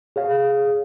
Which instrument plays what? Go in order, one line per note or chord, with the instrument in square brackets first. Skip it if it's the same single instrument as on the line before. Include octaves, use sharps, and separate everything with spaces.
[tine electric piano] G#4 C#5 F5